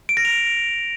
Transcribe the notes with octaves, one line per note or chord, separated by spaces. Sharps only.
D7
A#6
F7